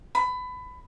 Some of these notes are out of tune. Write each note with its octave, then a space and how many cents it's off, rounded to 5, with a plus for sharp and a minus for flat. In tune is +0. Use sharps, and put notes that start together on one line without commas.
B5 +20